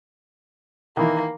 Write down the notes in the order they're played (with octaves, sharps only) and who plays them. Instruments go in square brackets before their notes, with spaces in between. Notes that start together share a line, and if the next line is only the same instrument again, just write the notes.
[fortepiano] D#3 E3 E4 [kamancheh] A#3